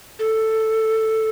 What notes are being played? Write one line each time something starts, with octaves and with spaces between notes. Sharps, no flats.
A4